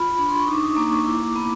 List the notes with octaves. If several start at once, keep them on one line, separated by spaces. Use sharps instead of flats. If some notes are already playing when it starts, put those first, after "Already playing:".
Already playing: F4 B5
D4 B5
C6
C#6
D#4 D6
D#6
A#3 D6
C#6
E4 D6
B3